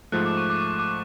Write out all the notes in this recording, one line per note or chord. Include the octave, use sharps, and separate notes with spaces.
G#2 F3 A3 F#6
D6
C#6
D6
D6
D6